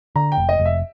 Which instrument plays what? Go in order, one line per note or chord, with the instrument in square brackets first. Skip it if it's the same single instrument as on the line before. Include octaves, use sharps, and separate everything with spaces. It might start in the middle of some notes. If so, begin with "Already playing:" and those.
[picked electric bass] D3 [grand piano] A#5
[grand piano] G5
[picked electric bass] F1
[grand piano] D#5
[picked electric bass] F1
[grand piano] E5